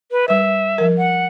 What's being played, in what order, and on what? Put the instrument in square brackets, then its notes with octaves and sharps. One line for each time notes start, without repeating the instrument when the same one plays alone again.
[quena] B4
[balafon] G3 B4 [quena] E5
[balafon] F3 A#4
[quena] F#5